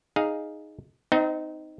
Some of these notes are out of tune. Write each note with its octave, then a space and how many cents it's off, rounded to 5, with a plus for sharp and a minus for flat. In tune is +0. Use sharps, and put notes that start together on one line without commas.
D#4 +0 G#4 +0 F5 +0
C4 -30 D#4 +0 D#5 +45